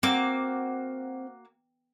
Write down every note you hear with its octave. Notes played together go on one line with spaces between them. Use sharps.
A#3 C4 F#4 D6